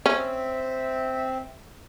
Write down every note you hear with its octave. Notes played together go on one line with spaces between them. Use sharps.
C4 C#4 E5